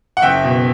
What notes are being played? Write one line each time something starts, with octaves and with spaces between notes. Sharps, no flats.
F#5
F#1 E5 G5
B2